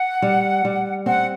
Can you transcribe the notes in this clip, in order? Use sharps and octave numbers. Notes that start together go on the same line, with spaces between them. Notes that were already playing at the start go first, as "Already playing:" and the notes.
Already playing: F#5
G3
G3
C4 F#5